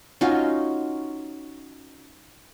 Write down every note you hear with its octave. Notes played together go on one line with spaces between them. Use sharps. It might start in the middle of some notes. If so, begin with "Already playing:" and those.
C#4 D#4 F4 F#4